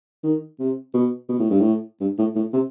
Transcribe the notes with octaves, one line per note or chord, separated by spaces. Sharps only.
D#3
C3
B2
B2
A2
G2
A2
G2
A2
A2
C3